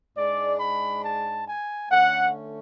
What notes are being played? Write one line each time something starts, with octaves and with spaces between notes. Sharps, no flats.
G#2 G#3 D4 D5
B5
A5
G#5
D3 A3 C#4 F#5